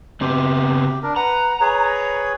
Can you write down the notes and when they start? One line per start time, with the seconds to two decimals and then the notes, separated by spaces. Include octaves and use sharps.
0.21 C#3 B3 C4 G4
1.03 D4 A#4
1.16 B4 F#5 A#5
1.61 G#4 B4 C#5